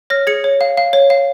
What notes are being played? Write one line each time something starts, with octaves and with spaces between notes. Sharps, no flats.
C#5 F6 A#6
G#4 G#6 C#7
C#5
F5
F5
C#5
F5